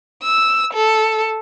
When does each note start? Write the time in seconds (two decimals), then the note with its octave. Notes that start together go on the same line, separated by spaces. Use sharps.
0.24 E6
0.74 A4